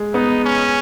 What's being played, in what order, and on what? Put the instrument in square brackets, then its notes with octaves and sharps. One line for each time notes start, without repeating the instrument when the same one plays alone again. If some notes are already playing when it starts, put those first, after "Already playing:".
Already playing: [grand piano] G#3
[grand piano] B3 [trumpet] D#4
[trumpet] C#4